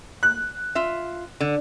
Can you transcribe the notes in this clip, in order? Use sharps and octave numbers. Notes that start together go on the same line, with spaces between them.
F#6
F4 E5
D3